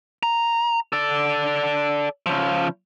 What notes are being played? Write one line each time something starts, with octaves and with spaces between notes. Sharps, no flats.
A#5
A4 D5
C#3 F3